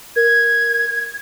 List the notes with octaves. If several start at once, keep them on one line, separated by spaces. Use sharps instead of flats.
A#4 G#6